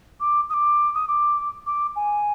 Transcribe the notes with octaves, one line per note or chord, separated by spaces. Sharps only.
D6
D#6
D6
D#6
D6
D6
G#5